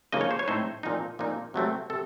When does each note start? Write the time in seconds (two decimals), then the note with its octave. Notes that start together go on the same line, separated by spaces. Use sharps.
0.12 C#3 F3 A#3 D#4 D#5
0.21 C#5
0.31 C5
0.39 C#5
0.48 A2 A3 C4 D#4 C5
0.83 A#2 F3 C4 D#4
1.19 A#2 F3 A#3 D#4
1.54 C3 F#3 A3 C4
1.90 C3 A4